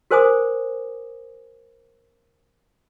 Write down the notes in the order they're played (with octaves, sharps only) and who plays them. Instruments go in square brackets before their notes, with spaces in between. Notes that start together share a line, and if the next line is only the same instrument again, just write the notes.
[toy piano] F#4 A#4 C5 G#5 D6 D#6